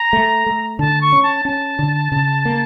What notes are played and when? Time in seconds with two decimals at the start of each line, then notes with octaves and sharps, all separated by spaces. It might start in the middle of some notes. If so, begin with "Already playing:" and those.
Already playing: A#5
0.13 A3
0.46 A3
0.79 D3 A5
1.01 C#6
1.12 C#4
1.23 A5
1.45 C#4 A5
1.79 D3
2.12 C#3
2.45 A#3